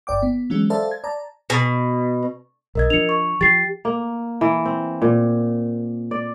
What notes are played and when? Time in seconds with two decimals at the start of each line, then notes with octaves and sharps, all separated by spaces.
0.07 G1 D5 G5 D6
0.22 B3
0.50 E3 F#3 G#3 C#4
0.70 A4 C5 D5 E5 F5 A5
0.91 G#6
1.04 D5 A5 A#5
1.50 B2
2.75 B1 A#4 D#5 G#6
2.90 F3 D4 C#7 F7
3.09 C#6
3.41 F3 G4 A6 C7
3.85 A#3
4.41 E3
4.65 C4
5.02 A#2
6.11 D5